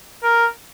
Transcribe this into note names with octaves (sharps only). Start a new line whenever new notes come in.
A#4